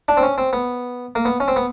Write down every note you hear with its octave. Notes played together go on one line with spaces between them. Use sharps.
D4
C4
C#4
C4
B3
A#3
B3
C#4
C4
B3